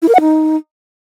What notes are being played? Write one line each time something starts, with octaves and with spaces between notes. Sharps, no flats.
E4
A#4
F#5
D#4